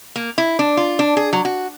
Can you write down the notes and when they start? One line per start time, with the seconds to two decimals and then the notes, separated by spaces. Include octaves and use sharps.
0.16 A#3
0.38 E4
0.59 D4
0.77 F4
0.99 D4
1.17 G#4
1.33 F#3
1.45 F#4